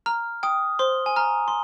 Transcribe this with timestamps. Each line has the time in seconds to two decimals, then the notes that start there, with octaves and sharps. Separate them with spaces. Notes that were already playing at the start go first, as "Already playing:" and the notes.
0.06 A#5 F6
0.43 G5 D#6
0.79 C5 C6
1.06 G#5
1.16 A#5 F6
1.48 C6